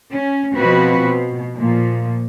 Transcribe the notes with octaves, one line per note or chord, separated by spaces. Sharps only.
C#4
B2 F3 C4 F#4 B4
B2
A#2 F3